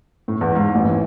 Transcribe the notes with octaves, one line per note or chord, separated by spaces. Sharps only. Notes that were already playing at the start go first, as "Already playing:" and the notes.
A2
E2
G#2
A1
E3